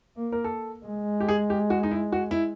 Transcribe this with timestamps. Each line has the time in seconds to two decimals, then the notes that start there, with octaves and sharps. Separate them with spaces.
0.16 A#3
0.32 A#4
0.44 A4
0.86 G#3
1.20 G4
1.29 G#4
1.50 G4
1.70 F#4
1.83 D#4
1.91 E4
2.12 F#4
2.31 E4